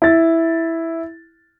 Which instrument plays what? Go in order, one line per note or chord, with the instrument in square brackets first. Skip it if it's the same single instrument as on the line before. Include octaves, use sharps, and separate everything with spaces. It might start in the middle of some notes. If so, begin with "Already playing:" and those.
[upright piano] E4 A6